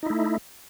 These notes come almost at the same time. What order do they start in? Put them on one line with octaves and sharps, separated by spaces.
D#4 E4 A3